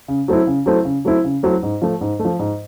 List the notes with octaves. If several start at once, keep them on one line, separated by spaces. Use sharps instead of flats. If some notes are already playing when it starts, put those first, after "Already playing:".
C#3
F#3 A3 C4 E4
C#3
F#3 A3 C4 E4
C#3
F#3 A3 C4 E4
C#3
F#3 A3 C4 E4
G#2
F3 A3
G#2
A3
F3
G#2